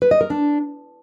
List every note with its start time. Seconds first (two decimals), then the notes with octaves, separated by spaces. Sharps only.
0.02 B4
0.11 D#5
0.21 A#4
0.30 D4